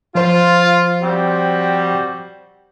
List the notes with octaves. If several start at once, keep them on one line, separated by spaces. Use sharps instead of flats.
F3 F4 C5 C6
G3 C4 F#4